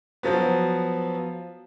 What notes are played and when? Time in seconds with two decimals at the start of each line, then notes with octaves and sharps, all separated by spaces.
0.23 F3 F#3 B3